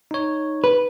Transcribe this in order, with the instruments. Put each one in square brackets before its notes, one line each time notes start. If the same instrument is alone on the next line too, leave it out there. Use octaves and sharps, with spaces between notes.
[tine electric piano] D#4 C#5
[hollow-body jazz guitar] B4